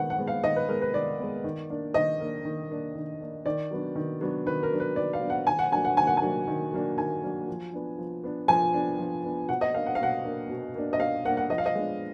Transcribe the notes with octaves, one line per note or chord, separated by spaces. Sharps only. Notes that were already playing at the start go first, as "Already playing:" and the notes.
Already playing: D#3 G#3 B3 F#5
F#5
G#3 B3
F5
D#3 D#5
B4
G#3 B3 A#4
B4
D#3 D5
G#3 B3
D#3
A#3 D4
D#3 D#5
A#3 D4
D#3
A#3 D4
D#3
A#3 D4
D#3 D5
F#3 B3 D4
D#3
F#3 B3 D4
D#3 B4
A#4
F#3 B3 D4
B4
D#3 D5
F5
F#3 B3 D4
F#5
D#3 G#5
F#5
F#3 A#3 D4 G#5
F#5
D#3 G#5
F#5
G#5
F#3 A#3 D4
D#3
F#3 A#3 D4
D#3 G#5
F#3 A#3 D4
F3
B3 D4
F3
B3 D4
F3 G#5
B3 D4
F3
B3 D4
B2 F#5
D#5
A#3 D4 F5
F#5
F5
B2 F#5
A#3 D4
B2
A#3 D4
D#5
B2 F5
A#3 D4 F#5
F#5
F3 D#5
F5
D#5
G#3 B3 D4